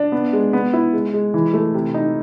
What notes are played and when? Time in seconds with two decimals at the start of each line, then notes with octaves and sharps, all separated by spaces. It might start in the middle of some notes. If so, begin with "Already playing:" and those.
Already playing: D4
0.12 B3
0.33 G#3
0.53 B3
0.73 E4
0.93 G#3
1.13 G#3
1.34 E3
1.54 A3
1.74 C3
1.94 D#4